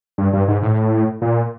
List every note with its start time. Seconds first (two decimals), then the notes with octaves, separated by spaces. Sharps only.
0.18 G2
0.33 G2
0.48 G#2
0.63 A2
1.22 A#2